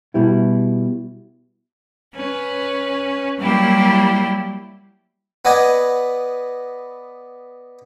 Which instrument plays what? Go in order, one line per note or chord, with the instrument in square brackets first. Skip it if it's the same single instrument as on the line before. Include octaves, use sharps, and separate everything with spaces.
[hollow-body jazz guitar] B2 G3 E4
[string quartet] C#4 B4
F#3 G3 A#3 E4 G4
[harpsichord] B3 B4 D5 D#5 F#5 G#5